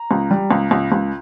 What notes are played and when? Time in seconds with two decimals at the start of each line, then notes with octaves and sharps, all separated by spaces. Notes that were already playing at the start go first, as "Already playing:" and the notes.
Already playing: A#5
0.11 C#2
0.31 G3
0.51 C#2
0.71 C#2
0.92 C#2